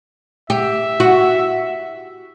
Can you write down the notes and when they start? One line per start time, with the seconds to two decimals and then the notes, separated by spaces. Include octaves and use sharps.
0.50 G4 E5
1.00 F#4